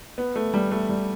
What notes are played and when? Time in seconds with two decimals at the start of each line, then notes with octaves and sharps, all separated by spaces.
0.18 B3
0.36 A3
0.54 G3
0.71 A3
0.89 G3